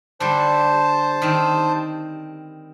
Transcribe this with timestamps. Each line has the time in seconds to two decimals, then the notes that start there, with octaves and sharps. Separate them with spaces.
0.20 D3 G3 C5 A5
1.22 D#3 C4